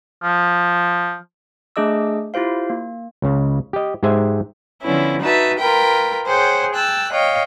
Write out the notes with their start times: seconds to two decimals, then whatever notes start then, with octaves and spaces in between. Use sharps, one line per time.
0.23 F3
1.76 A3 D4 G#4 D#5 D6 E6
2.34 E4 F4 G4 C5 F5
2.70 A#3
3.22 C#2 C#3
3.73 G4 D#5
4.03 G#2 G4 G#4 C5 E5 G#5
4.82 D3 F3 B3 C#4 E4
5.20 D#4 F#4 B4 E5 A5
5.58 F4 A#4 B4 G5 B5
6.26 G#4 C5 C#5 F#5 G5
6.73 G5 A5 E6 F#6
7.11 C#5 D#5 F5 G5